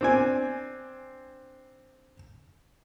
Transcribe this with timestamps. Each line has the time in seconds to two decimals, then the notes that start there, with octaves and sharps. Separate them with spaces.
0.01 C4 D4 G#5